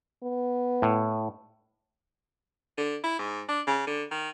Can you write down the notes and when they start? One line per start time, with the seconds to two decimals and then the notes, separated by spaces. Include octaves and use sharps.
0.24 B3
0.82 A2
2.78 D3
3.04 E4
3.19 G#2
3.48 D4
3.67 C#3
3.87 D3
4.11 D#3